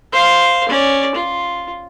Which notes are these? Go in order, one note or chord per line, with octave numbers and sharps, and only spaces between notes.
C5 F5
C#4 D5
F4